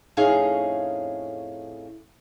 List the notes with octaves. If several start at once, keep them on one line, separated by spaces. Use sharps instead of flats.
F2 A2 C#4 D#4 G#4 F5